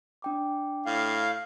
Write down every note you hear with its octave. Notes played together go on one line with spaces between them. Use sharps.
D4 G5 D6
A2 F5